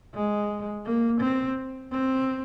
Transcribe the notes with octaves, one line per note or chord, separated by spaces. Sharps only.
G#3
A#3
C4
C4